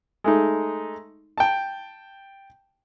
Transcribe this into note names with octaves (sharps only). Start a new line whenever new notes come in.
G#3 A3 D#4
G5 A5